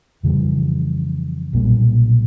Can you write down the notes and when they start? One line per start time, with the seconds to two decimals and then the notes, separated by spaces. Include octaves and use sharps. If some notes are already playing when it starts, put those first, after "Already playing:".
0.23 F2 C#3 E3 G3
1.53 B1 A#2 G3 A#3